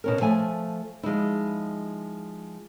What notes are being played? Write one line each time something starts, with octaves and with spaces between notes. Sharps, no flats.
B2 C#4 A#4
F3 A3 G#5
F3 G#3 D#4 E4